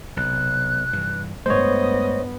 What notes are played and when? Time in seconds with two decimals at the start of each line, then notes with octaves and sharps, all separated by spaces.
0.17 B1 C3 F#6
0.93 G2 E3
1.46 G2 G#3 A3 B3 C5 C#5 D#5